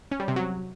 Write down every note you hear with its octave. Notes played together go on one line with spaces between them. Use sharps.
C#4
G3
C3
F#3